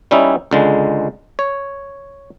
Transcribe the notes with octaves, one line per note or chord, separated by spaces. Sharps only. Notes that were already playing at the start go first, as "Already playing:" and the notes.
G3 C#4 D#4 E4
C#2 D3 G#3
C#5